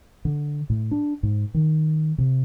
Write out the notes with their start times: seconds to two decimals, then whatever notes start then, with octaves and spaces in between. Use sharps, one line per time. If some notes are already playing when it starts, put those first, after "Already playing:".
0.25 D3
0.70 A2
0.91 D4
1.23 G#2
1.54 D#3
2.18 C3